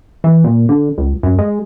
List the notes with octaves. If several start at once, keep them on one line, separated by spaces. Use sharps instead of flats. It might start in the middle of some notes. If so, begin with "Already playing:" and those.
E3
A#2
D3
C#2
F#2
G#3